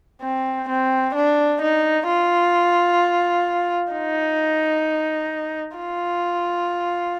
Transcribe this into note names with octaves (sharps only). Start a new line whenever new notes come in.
C4
C4
D4
D#4
F4
D#4
F4